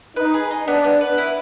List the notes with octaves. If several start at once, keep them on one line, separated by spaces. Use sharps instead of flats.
D#4 B4
G#4
D#4
B3 D4
B3
B4
E4